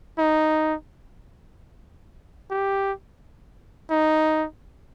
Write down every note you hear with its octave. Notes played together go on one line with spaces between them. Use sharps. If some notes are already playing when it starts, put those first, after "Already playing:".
D#4
G4
D#4